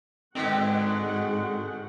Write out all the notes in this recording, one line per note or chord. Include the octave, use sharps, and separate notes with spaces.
G#2 B2 D3 D#3 G#3 C4 F#4 F#5